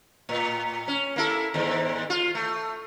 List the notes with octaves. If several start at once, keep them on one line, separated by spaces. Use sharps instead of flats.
A2
C#4
A#3 E4 A4
D#2 G#2
F4
A3